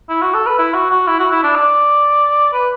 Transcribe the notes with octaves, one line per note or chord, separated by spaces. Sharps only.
E4
F#4
A4
B4
E4
F#4
F#4
E4
F#4
E4
D4
D5
B4